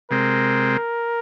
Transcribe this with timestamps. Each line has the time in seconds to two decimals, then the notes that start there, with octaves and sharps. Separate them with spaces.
0.11 C3 G#3 C4 A#4